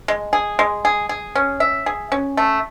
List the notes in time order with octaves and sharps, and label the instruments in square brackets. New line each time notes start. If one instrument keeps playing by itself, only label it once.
[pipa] G#3
G#4
G#3
G#4
G#4
C#4
E5
G#4
C#4
A3